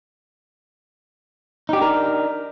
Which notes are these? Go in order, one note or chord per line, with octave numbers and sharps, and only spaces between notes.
D4 D#4 G4 A#4